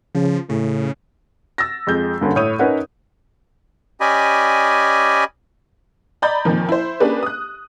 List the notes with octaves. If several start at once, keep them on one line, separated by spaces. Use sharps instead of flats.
C#3 F3
A2 C#3
E6 A6 A#6
F2 G#3 G6
G2 D3 A#3 C#4
A2 C#5 D#6 G6 D#7
C#4 D#4 A#4 B4 C#5 F#5
C#4 G4 D5 D#5 G#5 B5
D5 D#5 A#5 B5 G6 A6
F2 A#2 D#3 F3
E4 C5
A#3 C#4 D4 G4 G#4 B4
D#6 F#6